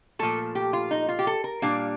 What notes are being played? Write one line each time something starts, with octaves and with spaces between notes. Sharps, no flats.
A#2 F3 A3 A4
G4
F4
D#4
F4
G4
A4
A#4
A#2 G3 A#3 D4 F5